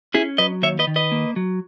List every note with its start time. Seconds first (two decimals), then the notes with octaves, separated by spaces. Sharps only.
0.14 C#4 E4 G#4
0.38 F#3 B4 D#5
0.62 D#2 C#5 E5
0.79 B4 D#5
0.87 D#3
0.96 B4 D#5
1.12 A#3
1.36 F#3